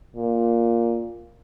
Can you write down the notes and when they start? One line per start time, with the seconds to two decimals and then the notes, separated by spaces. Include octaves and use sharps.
0.16 A#2